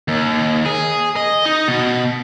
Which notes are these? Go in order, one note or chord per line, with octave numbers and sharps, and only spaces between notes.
D#2
G#4
D#5
D#4
B2